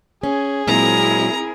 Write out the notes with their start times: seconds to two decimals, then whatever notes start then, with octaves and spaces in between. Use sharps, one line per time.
0.23 C#4 G#4
0.67 A#2 F#3 G#3 C4 E4 A#4 A#5